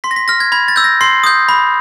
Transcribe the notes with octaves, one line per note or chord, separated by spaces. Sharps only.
C6 B6
A#6
B6
F6 A#6
G#6
B5 G#6
A6
E6 G6
A#6
C6 C7
D#6 G6
B5